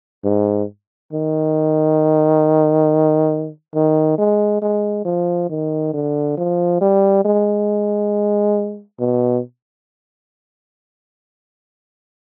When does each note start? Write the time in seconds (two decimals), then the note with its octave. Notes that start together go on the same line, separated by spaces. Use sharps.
0.24 G#2
1.13 D#3
3.75 D#3
4.18 G#3
4.62 G#3
5.05 F3
5.50 D#3
5.94 D3
6.37 F3
6.81 G3
7.25 G#3
9.00 B2